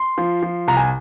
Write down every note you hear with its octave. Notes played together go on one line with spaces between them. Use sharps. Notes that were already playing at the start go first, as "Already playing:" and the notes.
Already playing: C6
F3
F3
C2 A#5
G#5